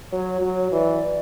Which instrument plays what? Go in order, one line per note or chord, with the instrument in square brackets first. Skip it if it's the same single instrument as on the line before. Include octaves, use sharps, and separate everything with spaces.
[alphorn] F#3 [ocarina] C#5
[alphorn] F#3
[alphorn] E3 [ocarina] D5